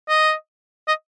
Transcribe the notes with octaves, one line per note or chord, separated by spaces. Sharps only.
D#5
D#5